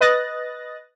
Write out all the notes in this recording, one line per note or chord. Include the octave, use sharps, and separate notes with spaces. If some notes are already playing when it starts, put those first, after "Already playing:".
B4 D#5 D#6 F#6 A6 A#6